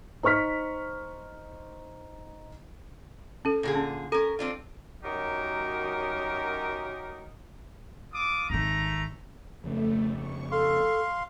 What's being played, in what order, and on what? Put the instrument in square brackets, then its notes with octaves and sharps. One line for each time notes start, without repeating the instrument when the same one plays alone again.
[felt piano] D#4 C5 C#6 F6 B6
[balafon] C#4 A4
[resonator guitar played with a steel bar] A#2 D3 G#4
[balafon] C#4
[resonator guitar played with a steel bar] C#4 A#4 [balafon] A4
[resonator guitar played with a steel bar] C4 D4 F4
[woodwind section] F#2 F#3 D#4 G4 A#4
[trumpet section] F4 D6 D#6
[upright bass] G#1 D#3 [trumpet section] A3 A#5
[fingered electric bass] F2 C#3 [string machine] A3
[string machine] C#6
[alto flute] A4 [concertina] F5 C6